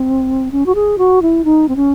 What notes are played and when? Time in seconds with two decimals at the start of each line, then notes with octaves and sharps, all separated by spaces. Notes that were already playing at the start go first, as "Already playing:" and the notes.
Already playing: C4
0.51 C#4
0.66 F#4
0.75 G#4
0.98 F#4
1.22 E4
1.44 D#4
1.68 C4
1.76 C#4